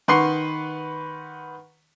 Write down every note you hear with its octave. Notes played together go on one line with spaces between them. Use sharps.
D#3 B4 F#5 C6 C#6 C7